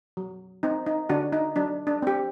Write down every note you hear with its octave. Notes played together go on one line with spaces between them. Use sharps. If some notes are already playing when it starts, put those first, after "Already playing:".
F#3
C4 D#4
D#4
D3 D4 F#4
D#4
F#3 D4
D4
C4 G4